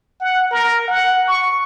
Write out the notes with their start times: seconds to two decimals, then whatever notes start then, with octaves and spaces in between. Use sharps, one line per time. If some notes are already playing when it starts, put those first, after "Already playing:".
0.20 F#5
0.51 A#4
0.88 F#5
1.28 C#6